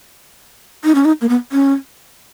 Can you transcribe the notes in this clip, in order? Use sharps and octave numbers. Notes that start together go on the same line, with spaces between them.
D#4
C#4
D#4
A#3
B3
C#4